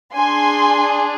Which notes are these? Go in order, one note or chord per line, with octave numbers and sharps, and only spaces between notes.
D4 G#4 G#5 C6